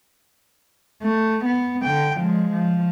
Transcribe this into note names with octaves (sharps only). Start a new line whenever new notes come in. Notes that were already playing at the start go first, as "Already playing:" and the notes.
A3
B3
D3 G5
F3 G#3
F3